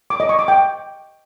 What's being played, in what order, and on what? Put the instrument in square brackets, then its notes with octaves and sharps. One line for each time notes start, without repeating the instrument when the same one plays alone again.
[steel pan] D6
D#5
C#6
D6
G5